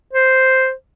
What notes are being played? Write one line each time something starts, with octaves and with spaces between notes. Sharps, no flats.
C5